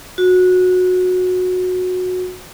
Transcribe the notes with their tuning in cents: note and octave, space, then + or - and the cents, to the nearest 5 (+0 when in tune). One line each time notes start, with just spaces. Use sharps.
F#4 -20